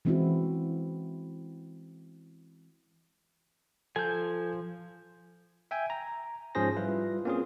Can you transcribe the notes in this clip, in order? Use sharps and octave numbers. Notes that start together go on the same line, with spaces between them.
E3 G#3 C4 C#4 E4 F#4
F3 A4 G#5 G6
E5 G5 G#5
A#5
G#2 F3 C#4 G#4 C5 A#6
G3 E4 F4 B4
A#3 C4 C#4 F4 G#4